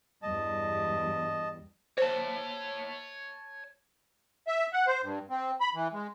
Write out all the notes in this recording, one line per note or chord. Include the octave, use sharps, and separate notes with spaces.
E2 G2 G3 D#5 A5
C5 C#5 A5
E5
F#5
C5
G2
C4
B5
E3
G#3